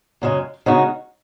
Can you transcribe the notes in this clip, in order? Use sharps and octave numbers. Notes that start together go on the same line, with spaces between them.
F#2 C#3 G#3
C#3 G#3 B3 D#4 F#4